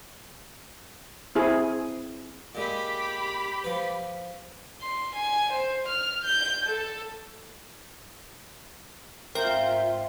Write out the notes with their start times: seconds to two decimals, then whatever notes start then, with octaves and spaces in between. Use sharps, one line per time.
1.35 C4 E4 G#4
2.55 A#2 G#3 G4 B5
3.64 F3 B4
4.81 C6
5.16 G#5
5.52 C5
5.88 F6
6.24 G6
6.66 A4
9.35 G#2 C4 F4 A#4 E5 G6